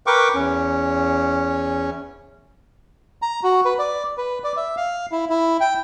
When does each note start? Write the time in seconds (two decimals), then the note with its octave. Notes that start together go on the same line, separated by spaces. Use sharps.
0.07 A#4 B4 G5 C#6 D6
0.34 E2 C#4
3.22 A#5
3.43 F#4
3.65 B4
3.79 D5
4.18 B4
4.44 D5
4.57 E5
4.77 F5
5.12 E4
5.30 E4
5.61 G5